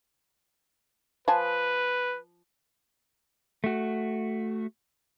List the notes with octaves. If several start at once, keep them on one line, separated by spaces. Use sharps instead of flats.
F3 B4 G#5 A5
A3 F#4